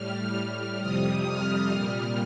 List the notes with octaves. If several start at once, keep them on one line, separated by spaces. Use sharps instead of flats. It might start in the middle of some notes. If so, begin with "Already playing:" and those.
Already playing: A2 G3 F6
F6
F2 C3 G3 D#6
F6
A#2 G3 F6